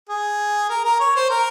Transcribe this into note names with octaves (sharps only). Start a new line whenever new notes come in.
G#4
A#4
A#4
C#5
C5
A#4